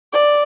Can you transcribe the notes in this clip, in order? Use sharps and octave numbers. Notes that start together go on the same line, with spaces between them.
D5